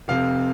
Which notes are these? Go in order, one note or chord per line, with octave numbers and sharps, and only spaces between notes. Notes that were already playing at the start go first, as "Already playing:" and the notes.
F1 F2 C3 F5